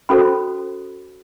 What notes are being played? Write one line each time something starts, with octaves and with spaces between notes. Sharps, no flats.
C#4 F#4 A4 C5 B5